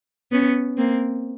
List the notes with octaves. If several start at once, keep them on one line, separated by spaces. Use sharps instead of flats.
B3 C#4
A#3 C4